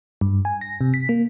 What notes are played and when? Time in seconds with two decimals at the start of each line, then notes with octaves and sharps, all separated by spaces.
0.21 G2
0.45 G#5
0.61 A#6
0.81 C3
0.94 B6
1.09 A#3